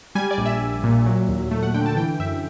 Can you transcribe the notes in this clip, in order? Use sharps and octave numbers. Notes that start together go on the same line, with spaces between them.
G3 G#5
D5
A#1
E5
A#1
A#2
F#3
D#2
A3
F#5
D3 G5
A5
E3 G5
F#2 E5